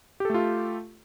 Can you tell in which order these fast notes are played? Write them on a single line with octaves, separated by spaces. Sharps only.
G4 A4 A3 F4